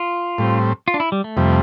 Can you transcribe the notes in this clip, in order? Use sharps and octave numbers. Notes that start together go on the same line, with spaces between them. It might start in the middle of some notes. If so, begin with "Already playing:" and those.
Already playing: F4
A2 G3 C4
F4
D4
E4
G3
A3
F2 C3 G3